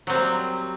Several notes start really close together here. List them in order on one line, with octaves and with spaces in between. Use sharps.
F#3 C4 G3 A#3